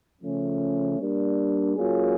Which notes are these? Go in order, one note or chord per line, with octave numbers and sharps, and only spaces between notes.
C#3 F3 A3 C#4
G3 A#3 D4
F#3 A#3 C#4 F4 G#4